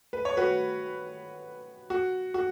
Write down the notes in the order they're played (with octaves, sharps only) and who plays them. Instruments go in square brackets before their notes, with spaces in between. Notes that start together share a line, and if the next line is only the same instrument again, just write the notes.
[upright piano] B4
C#5
F#4 B4
F#4
F#4